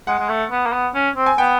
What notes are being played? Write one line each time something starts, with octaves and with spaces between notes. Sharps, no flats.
G#3 F#5
G#3
A3
B3
A#3
B3
C#4
C4
G#5
B3 G5